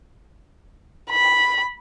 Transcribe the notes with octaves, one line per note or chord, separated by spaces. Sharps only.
B5